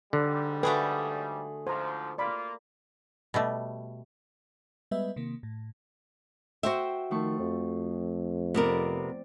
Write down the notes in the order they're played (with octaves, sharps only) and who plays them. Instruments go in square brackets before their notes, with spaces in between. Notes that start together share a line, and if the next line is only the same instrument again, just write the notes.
[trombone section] G#2 G3 [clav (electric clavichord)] D3
[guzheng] A3 F#4 G#4 [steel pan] A4 B4 G5
[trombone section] G#2 F3 [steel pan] C5 A#5
[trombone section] A#3 F4 [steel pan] D5 B5 D6
[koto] B2 G3 A3
[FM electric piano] G3 G#3 B3 B4 D#5 E5
C3 D#3 A#3
A2
[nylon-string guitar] F#4 C5 E5 [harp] G5
[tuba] D#3 [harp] F3 A3 C#6
[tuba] F2
[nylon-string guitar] C3 B3 A#4 [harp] C4 D5